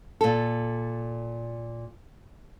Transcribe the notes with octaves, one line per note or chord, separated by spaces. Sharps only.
A#2 A4